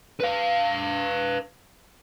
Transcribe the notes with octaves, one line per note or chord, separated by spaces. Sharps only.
B4 F5